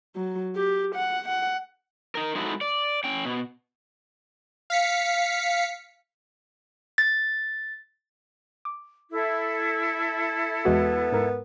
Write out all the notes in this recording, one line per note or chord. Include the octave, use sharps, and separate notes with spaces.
F#3
G4
F#5
F#5
D#4 A#4
G#3 D#4 E4 F#4 A4
D5
C#4 G5
B2
F5 B6 C#7
A6
D6
E4 A4
E2 G#3 B3 F#4
G#2 A#4